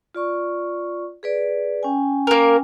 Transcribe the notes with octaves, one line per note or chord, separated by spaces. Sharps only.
F4 D5 C#6
G#4 B4 D5
C#4 G5 G#5
A#3 A#4